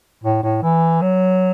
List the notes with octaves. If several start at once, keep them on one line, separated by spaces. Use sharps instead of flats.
A2
A2
E3
F#3